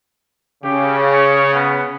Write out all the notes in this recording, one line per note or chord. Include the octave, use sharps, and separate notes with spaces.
C#3 G4
C#5
B3